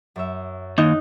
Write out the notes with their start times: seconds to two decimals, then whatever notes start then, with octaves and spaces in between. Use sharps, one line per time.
0.16 F#2 C#5 E5
0.78 D#2 D#4 F#6